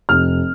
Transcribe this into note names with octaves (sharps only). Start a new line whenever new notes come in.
F1 F6